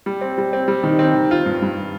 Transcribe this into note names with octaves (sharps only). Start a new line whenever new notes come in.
G3
C4
G3
C4
G3
D#3
C4
D#3
F4
G2
G2